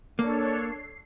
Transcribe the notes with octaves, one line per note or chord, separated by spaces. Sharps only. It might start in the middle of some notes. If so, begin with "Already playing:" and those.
A#3 D4 A4 C#5
C7